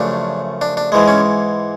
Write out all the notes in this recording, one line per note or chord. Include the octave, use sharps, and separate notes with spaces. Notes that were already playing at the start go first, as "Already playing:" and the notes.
Already playing: F#2 C#3 F3 A3 D4
D4
D4
G#2 E3 G#3
C#4